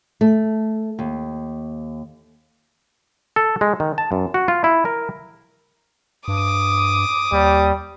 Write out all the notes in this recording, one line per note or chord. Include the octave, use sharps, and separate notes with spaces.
A3
D#2
A4
G#3
D#3
A5
F#2
F#4
F4
E4
A#4
G2 D6 D#6
D#2 G3